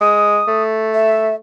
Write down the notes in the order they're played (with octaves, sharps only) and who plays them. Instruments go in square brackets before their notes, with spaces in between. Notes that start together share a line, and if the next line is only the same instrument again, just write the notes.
[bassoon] G#3 [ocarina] D#6
[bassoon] A3
[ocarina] E5